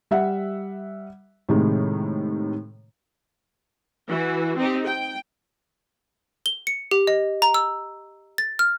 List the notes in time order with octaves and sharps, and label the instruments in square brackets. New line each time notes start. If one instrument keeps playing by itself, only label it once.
[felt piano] G3 E5 F#5
A2 C3 D#3 G#3
[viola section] E3 F#4
C4 D#4 G4
G5
[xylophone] G7
C#7
G4
D#5
A#5
E6
A6
F6